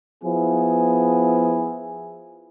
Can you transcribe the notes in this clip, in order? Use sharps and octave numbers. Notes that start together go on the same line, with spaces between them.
F3 B3 E4 G#4